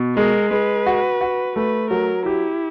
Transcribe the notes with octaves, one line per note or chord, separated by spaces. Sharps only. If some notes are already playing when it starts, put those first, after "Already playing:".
Already playing: B2
G#3 A#4
G#3 B4
F#4
F#4
A3 B4
F#3 A#4
E4 G4